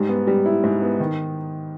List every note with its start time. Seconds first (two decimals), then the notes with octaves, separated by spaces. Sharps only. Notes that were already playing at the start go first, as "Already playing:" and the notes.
Already playing: G#2 G3
0.09 B3
0.27 G3
0.46 E4
0.63 G#2
0.82 B3
1.00 D#3